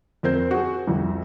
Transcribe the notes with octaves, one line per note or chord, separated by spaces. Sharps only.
F2 C4 A#4 C5 G6
F#4 G#4
C2 F2